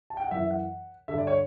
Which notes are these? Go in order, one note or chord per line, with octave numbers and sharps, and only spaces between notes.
A5
G5
F#5
F#2 E3 E5
F#5
G2 D3 E5
D5
C#5